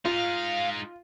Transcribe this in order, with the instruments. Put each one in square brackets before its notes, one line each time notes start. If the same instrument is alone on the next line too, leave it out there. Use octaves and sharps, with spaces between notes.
[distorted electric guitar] G#3 D#4 [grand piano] F4 [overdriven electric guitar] F5